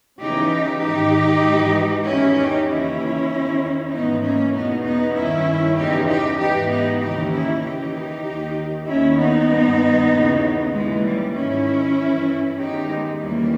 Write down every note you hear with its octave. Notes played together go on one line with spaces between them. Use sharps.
E2 C#3 E3 D#4 G4
G#2 D#3 D#4 G4
G#2 E3
E2 D#3 C#4 E4
D#4 G4
D#2 C#3 E3 C#4 E4
E2 D#3
G#2 E3 B3 D#4
A#3 C#4
E2 B2 B3 D#4
B3 D#4
G2 D#3 C#4 E4
E2 C#3 E3 D#4 G4
D#4 G4
G#2 E3 D#4 G4
B3 D#4
D#2 C#3 E3 D#4 G4
C#4 E4
D#2 C#3 E3 D#4 G4
D#2 D#3
D#2 D#3 C#4 E4
B3 D#4
G2 D#3
D#2 C#3 E3
D#2 C#3 E3 G#3
G3
G#2 D#3 C#4 E4
G2 E3
E2 D#3 D#4 G4
G#3
D#2 C#3 E3 G3 A#3